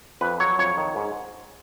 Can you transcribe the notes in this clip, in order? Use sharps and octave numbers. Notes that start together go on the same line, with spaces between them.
F2 B4
F#3 C#5
F2 C#5
D#3
G#2